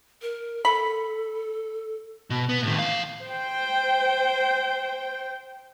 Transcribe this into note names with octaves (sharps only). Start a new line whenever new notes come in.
A#4
A4 B5
B2
B3
A2 D#3
E3 F5
C5 G5